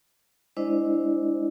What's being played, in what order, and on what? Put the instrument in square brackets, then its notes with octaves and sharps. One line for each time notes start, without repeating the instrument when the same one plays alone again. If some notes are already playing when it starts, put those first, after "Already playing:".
[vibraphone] G#3 D4 E4 C5 D5 D#5